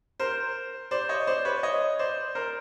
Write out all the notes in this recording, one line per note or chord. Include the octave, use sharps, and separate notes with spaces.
A#4 C5
C5 D5
C#5 D#5
C5 D5
B4 C#5
C#5 D#5
C5 D5
A#4 C5